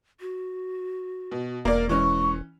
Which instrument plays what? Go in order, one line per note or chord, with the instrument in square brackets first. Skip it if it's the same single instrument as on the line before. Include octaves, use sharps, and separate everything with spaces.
[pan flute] F#4
[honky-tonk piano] B2
[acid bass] E1 [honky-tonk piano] A#3 D5 [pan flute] A#4
[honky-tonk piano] E3 C#4 [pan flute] G#3 [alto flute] C#6